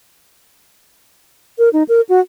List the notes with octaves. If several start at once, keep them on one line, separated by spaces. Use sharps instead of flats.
A#4
D#4
A#4
F#4